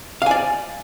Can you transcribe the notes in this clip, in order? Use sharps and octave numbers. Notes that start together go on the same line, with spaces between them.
D5 F5 G#5